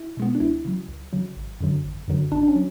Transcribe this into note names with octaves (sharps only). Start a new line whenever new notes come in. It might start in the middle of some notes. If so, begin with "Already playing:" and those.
Already playing: E4
B2 G#3 B3
D4
C#2 E4
C#3 F#3
C#2
C#3 F#3
G#1
F#2 D3 F#3
G#1
F#2 D3 F#3
G#1 D4
D4
C#4
F#3